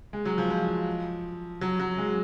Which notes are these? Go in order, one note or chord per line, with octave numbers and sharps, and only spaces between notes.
G#3
F#3
F3
F3
F#3
F#3
G#3